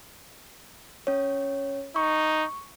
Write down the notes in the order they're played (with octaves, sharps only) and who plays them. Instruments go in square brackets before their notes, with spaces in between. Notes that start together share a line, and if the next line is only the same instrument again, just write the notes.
[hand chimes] C#4 C#5
[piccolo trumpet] D#4 [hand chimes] C#6